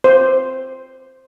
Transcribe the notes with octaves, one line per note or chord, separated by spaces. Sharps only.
C5